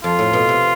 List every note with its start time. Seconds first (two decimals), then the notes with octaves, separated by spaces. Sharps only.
0.04 F2 F4
0.19 A2
0.33 B2
0.49 C3